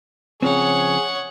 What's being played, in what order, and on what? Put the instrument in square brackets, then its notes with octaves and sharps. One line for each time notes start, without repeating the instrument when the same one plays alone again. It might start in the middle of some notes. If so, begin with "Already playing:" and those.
[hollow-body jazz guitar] C#3 F3 C4 [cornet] G#4 [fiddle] C#5 F#5